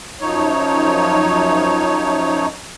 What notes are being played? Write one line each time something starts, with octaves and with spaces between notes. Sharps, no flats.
F#2 F3 D#4 C#5